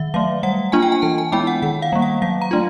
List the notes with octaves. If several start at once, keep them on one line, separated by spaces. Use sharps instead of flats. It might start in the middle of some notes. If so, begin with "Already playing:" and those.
Already playing: D#3 E5
F#3 A3 F5
G3 F#5
A#3 D4 F4 G#5
G5
G#5
E3 A5
G#5
G#3 B3 E4 G5
F#5
D#3 F#5
F5
G3 A#3
F#5
F#3 F5
A#5
A3 D4 F4